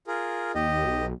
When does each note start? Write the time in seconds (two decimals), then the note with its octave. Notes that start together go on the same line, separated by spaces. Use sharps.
0.07 F4 G#4 A#4
0.55 D#2 G4 D#5
0.85 B1